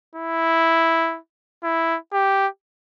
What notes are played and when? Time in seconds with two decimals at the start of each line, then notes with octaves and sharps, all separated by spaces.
0.15 E4
1.63 E4
2.13 G4